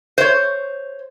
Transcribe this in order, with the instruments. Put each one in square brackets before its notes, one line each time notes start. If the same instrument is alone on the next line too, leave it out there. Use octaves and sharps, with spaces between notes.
[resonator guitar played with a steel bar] C5 C#5